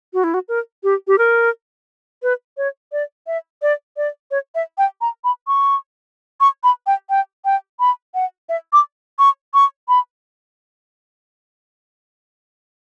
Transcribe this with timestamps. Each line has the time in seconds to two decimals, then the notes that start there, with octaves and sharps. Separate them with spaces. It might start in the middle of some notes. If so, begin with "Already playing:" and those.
0.14 F#4
0.24 E4
0.34 F#4
0.48 A#4
0.83 G4
1.07 G4
1.18 A#4
2.23 B4
2.57 C#5
2.92 D5
3.27 E5
3.62 D5
3.97 D5
4.31 C#5
4.55 E5
4.78 G5
5.01 A#5
5.24 B5
5.47 C#6
6.41 C#6
6.64 B5
6.87 G5
7.10 G5
7.45 G5
7.80 B5
8.14 F#5
8.49 E5
8.73 D6
9.19 C#6
9.54 C#6
9.89 B5